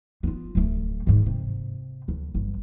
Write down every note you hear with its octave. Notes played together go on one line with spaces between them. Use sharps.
B3 F4
D1 A3
G#2 D#3
C3
D2
G1